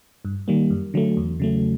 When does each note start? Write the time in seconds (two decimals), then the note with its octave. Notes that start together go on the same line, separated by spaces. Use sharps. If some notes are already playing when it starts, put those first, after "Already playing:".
0.25 G2
0.48 D#3 G3 A#3
0.70 F#2
0.94 D3 F#3 A3
1.17 E2
1.40 C#3 F#3 A3